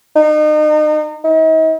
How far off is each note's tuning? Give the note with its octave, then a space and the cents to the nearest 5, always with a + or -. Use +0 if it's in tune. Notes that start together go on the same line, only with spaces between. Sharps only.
D#4 -35
D#4 +40